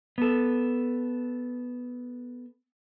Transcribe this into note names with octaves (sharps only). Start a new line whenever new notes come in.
B3 A4